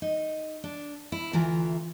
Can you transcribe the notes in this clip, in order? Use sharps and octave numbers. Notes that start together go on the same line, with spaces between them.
D#4
D4
E4
D2 E3 F4 E5 A#5